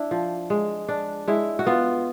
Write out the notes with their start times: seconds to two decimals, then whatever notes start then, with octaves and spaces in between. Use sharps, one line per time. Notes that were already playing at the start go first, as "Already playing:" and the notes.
Already playing: D4 E4
0.11 F3
0.50 G#3
0.89 D4
1.28 G#3 E4
1.59 F#4
1.66 B3 F4